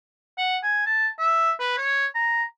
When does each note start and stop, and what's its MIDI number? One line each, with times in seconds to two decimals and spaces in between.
0.38 0.57 78
0.63 0.85 80
0.86 1.08 81
1.19 1.52 76
1.60 1.75 71
1.78 2.06 73
2.15 2.43 82